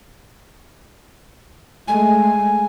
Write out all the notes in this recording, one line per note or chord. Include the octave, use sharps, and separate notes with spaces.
G#3 A3 G#5